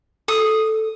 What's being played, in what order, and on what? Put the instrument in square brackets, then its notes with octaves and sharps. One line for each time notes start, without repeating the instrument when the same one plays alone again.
[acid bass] A4 [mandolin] D#6